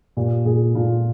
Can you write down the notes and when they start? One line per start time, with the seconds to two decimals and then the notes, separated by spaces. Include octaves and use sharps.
0.17 A#2 G4
0.45 A#2 G#4
0.75 A#2 F4